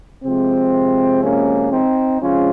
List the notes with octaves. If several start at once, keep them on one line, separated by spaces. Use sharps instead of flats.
C3 F3 G#3 C4
A#3 C#4
C4 D#4
C3 F3 G#3 C#4 F4